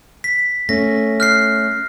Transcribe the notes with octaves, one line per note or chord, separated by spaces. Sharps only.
B6
A3 C#4 A#6
F6 F#6 C7